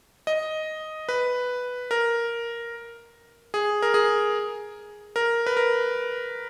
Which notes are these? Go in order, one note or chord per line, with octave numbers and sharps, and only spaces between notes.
D#5
B4
A#4
G#4
A#4
G#4
A#4
B4
A#4